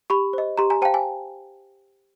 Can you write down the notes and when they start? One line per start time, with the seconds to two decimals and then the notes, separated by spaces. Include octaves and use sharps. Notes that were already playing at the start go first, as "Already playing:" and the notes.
0.10 G4 B5 C#6
0.33 C5 D#5
0.58 G4 A#5 C6
0.70 G#5 A#5
0.82 C5 F5 G5 A5
0.94 G#5